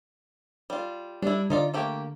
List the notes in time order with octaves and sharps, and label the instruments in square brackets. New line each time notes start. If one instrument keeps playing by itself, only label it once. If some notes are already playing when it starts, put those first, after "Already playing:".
[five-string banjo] G3 F4
[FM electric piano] G3 [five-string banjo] D4 E4
[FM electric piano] D3 [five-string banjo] D#4 F4 D5
[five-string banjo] A3 A#3 G4